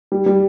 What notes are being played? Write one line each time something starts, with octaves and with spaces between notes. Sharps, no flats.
G3
G3